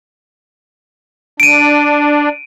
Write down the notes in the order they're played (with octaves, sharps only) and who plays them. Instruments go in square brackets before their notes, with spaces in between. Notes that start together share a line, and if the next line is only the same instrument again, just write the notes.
[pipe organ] D4 [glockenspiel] D7 D#7